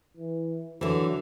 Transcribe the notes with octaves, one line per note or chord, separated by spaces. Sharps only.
E3
D3 E3 F#3